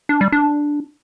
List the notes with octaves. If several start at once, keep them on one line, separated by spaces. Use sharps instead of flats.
D4
G3
D4